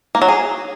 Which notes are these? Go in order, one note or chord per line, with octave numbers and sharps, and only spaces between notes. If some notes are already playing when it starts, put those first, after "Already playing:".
A#3
F#3
G#4